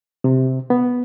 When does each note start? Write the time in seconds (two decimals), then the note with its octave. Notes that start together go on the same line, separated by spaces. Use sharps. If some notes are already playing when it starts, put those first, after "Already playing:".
0.24 C3
0.70 B3